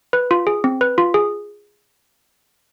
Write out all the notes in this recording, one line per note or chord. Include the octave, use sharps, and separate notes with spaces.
B4
F4
G#4
C4
B4
F4
G#4